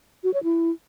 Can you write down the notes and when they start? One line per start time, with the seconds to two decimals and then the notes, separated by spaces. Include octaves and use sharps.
0.24 F#4
0.34 C#5
0.44 E4